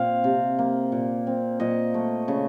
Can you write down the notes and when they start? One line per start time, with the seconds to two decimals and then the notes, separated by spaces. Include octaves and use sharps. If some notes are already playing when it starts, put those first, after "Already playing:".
Already playing: A#2 C4 F5
0.24 C3
0.59 A#3
0.92 A#2
1.27 C4
1.60 A#2 D#5
1.94 A3
2.28 C#3